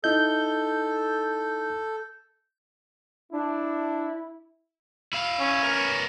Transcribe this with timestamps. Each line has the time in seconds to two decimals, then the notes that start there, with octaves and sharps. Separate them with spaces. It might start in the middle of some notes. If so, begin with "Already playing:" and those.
0.04 D#4 E4 A4 D#5 G6
3.32 D4 E4
5.13 E4 F5
5.41 C#4
5.63 B3 A#4